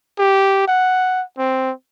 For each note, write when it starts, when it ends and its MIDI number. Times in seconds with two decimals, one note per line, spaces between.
0.18 0.64 67
0.68 1.22 78
1.38 1.72 60